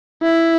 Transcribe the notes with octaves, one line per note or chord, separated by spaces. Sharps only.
E4